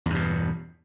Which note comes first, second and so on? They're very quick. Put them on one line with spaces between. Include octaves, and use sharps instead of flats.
E2 G2 B2